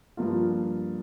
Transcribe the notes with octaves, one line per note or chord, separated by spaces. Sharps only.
G2 F3 A#3 F4